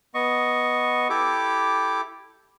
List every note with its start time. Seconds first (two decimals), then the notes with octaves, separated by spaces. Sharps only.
0.15 B3 D#5 C#6
1.10 E4 G4 A4 D6